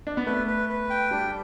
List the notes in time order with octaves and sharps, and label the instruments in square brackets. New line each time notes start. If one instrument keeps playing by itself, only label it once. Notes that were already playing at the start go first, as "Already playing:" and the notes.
[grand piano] D4
B3
[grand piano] A3 [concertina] B4
[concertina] B4
B4
G5
[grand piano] G3 [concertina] D4